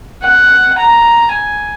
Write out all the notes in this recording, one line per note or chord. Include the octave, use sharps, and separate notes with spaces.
F#5
A#5
G#5